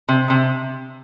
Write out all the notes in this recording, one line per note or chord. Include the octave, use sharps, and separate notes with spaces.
C3
C3